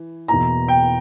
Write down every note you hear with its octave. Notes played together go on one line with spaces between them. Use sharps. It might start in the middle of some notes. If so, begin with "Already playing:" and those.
Already playing: E3
E2 B2 A#3 E4 A#5
G5